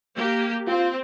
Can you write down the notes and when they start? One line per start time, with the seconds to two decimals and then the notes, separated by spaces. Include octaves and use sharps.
0.15 A#3 G4
0.67 C4 F4